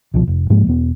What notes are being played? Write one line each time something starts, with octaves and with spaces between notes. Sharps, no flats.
C2 B2 F3
F1
G#2 F3 G#3 A#3
E1 B3